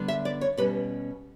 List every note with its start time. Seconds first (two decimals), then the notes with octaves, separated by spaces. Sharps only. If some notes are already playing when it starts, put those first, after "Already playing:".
Already playing: D3 G3 B3 D4
0.08 E5
0.25 D5
0.41 C#5
0.57 B2 G3 C#4 B4